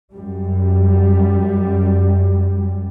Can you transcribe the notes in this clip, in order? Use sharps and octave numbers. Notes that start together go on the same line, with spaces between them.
F#2 G3